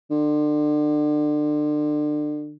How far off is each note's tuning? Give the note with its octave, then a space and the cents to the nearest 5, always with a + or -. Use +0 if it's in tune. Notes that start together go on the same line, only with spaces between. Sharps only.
D3 +30